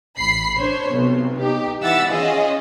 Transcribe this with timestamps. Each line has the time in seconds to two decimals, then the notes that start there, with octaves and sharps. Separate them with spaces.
0.17 A1 B5 C7
0.58 D4 C5 C#5
0.91 B1 C3
1.38 D#4 G4
1.81 E3 E5 F#5 E6 A6
2.10 C#4 F4 G#4 D#5